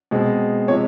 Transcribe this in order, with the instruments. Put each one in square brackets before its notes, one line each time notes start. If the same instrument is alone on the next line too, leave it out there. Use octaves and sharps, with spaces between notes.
[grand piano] B2 G#3 C4
C3 F3 G#3 C#5